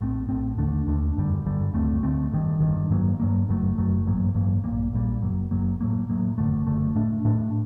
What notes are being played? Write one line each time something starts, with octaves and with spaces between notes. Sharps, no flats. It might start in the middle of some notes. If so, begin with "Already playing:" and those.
A#1 A2 A3 C4
A#1 A2 A3 C4
D#2 D3 A3 D4
D#2 D3 A3 D4
G1 F#2 D3 G3
G1 F#2 D3 G3
D2 D3 A3 C4
D2 D3 A3 C4
G1 G2 D#3
G1 G2 D#3
G2 F#3 A#3
G2 F#3 A#3
F#1 F#2 F#3 A3
F#1 F#2 F#3 A3
A1 G2 F#3 A#3
A1 G2 F#3 A#3
A#1 A#2 G3 A#3
A#1 A#2 G3 A#3
F#1 F#2 F#3 A#3
F#1 F#2 F#3 A#3
A2 F#3 A#3
A2 F#3 A#3
F#1 F#2 D3 A3
F#1 F#2 D3 A3
A2 A3 D4
A2 A3 D4